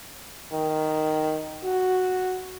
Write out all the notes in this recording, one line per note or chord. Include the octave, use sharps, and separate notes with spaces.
D#3
F#4